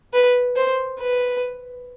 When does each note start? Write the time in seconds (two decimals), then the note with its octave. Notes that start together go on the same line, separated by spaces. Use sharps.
0.13 B4
0.57 C5
1.00 B4